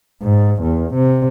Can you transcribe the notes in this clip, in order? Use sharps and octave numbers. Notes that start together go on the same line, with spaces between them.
G#2
E2
C3